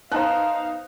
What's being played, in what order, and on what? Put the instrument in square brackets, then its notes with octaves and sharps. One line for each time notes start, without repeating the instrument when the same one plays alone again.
[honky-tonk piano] B3 D#4 C5 [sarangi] F5 [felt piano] A5 A#5 F#6